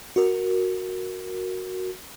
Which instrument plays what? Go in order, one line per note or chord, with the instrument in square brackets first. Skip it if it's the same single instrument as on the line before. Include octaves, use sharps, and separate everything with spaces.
[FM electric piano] F#4 A#4